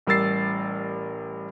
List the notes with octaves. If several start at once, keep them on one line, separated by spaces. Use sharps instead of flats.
A1 G3 A#4 E6 A6 C7